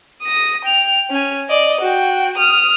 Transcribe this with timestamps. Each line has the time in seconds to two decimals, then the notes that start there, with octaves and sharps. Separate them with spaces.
0.23 D#6 A#6
0.64 G5 F7
1.10 C#4 G#5
1.49 D5 D#5
1.80 F#4 G5
2.37 D#6 F6